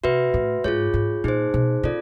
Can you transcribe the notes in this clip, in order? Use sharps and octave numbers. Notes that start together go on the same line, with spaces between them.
C3 F#4 B4 E5
A2
G#2 F4 G#4 C#5
G#2
A#2 D#4 G#4 C5
B2
C#3 F4 A4 D5